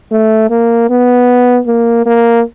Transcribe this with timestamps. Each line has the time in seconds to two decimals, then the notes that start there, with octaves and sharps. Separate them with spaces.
0.11 A3
0.50 A#3
0.90 B3
1.67 A#3
2.06 A#3